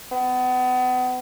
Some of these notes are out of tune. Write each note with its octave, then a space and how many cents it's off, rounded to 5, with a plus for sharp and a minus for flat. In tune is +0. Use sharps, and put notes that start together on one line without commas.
B3 +30